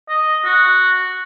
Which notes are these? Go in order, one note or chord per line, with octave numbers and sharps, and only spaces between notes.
D#5
F#4